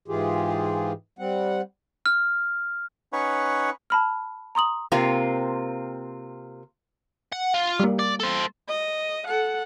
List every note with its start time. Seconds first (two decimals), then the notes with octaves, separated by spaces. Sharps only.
0.08 G#2 E3 F4 G4 G#4
1.19 G3 C4 F#5
2.06 F6
3.13 C#4 D#4 B4 C#5 F#5 C#6
3.90 A5 B5 F6
4.55 A#5 C6 D#6 F#7
4.92 C3 A#3 C4 F4
7.33 F#5
7.54 F4
7.80 G3 A#3
7.99 D5
8.20 A4 C5
8.68 D#5
9.26 A4 F#5